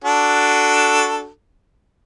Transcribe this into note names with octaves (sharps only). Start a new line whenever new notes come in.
D4 F#4 A4